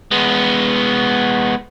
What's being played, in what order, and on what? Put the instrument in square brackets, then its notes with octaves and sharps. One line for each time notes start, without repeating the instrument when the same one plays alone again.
[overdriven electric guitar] G#3 B3